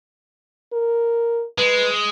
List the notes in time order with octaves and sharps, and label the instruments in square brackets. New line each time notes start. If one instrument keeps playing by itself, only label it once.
[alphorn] A#4
[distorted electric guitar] G#3 [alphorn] B4